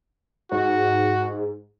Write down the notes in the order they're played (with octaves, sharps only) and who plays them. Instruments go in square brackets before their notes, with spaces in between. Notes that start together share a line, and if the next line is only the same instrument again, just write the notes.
[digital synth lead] G#2 [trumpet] F#4